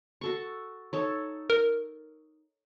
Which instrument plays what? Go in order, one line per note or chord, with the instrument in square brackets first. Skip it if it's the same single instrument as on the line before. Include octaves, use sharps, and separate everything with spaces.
[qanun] F#4 A4 C#6
D#4 A4 C#5
[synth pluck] A#4